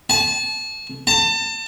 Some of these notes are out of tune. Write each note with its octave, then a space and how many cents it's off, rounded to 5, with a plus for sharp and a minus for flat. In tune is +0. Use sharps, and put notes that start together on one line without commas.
A5 -30
A5 +30